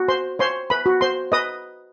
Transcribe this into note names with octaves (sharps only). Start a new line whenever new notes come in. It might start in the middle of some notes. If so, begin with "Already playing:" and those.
Already playing: F#4
C5 C6
C5 C#5 C6
B4 B5
F#4
C5 C6
B4 D#5 D#6